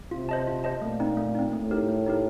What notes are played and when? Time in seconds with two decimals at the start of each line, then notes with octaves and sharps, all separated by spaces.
0.11 C3 F4
0.29 C5 D#5 A5
0.47 F4
0.64 C5 D#5 A5
0.82 A#2 A3
1.00 C4 D#4
1.17 A3
1.35 C4 D#4
1.53 A2 A3
1.71 D#4 G4 A#4
1.88 A3
2.06 D#4 G4 A#4